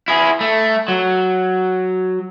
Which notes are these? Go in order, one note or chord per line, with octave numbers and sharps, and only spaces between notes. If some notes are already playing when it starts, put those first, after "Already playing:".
E4 G#4
A3
F#3